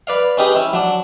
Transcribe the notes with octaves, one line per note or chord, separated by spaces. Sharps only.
B4 D5 F5
C#4 D#4 G4 G#4 B4
C#4 E4
F#3 D4